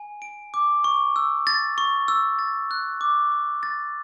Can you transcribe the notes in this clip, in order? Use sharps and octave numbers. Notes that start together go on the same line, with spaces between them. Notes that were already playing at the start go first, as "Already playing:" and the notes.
Already playing: G#5
D7
D6
C#6
E6
A6
C#6
E6
A6
F#6
D6
D6
A6